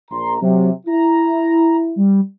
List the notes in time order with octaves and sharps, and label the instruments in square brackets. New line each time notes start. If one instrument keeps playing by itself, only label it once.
[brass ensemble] A#1 A#5 [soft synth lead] C6
[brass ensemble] C3 [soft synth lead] F#3
[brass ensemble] E4 [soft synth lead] A#5
[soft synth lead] G3